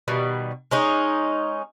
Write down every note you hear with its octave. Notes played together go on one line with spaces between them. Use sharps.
B2 D#3 G3
G#3 C#4 D#4